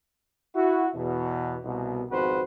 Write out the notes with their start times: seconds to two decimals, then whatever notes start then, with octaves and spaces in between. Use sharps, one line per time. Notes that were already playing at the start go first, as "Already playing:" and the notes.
0.56 E4 F#4
0.95 E2 B2
1.65 C2 B2
2.10 G#1 F2 F#4 B4 C5